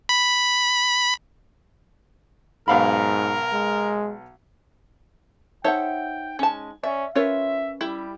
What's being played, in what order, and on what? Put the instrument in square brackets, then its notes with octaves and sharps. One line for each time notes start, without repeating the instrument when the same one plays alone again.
[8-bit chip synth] B5
[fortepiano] B1 F5 B5 [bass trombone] G#2 [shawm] A#4
[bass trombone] G#3
[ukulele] D#4 C5 F#5 [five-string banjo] A4 C#5 E5 [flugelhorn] G5
[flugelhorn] G#3 [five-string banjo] C#4 A5
[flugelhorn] C#4 [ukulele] D5 [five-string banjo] E5
[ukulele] C#4 A#4 B4 [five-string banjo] F4 C#5 [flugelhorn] E5
[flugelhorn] G3 [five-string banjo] E4 G4